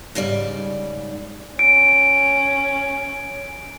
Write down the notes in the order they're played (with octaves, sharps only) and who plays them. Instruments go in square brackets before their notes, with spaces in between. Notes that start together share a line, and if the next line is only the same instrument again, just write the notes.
[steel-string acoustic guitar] G#2 C#3 G3 D5
[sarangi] C#4 [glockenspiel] D7